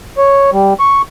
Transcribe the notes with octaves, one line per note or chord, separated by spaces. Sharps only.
C#5
G3
C#6